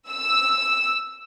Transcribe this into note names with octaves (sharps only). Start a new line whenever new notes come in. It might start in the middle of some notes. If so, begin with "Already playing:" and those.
E6